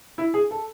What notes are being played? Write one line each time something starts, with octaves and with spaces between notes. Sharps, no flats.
E4
G#4
A4